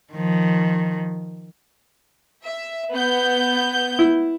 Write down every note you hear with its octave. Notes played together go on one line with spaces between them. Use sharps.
D#3 F3
E5
B3 G6
E4